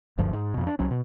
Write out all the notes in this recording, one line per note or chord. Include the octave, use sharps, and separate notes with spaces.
F#1 D2 G2 F3
G#2
F2 B2
D4
C2 F#3 C#4
B2